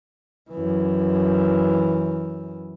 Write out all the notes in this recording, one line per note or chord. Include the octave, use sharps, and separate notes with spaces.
F#2 E3